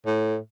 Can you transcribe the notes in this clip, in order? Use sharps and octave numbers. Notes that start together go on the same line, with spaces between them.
A2